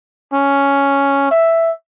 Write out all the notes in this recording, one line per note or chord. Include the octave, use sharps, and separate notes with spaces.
C#4
E5